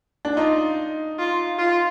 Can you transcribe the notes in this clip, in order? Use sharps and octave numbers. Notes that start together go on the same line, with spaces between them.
D4
D#4 F4
F4
F4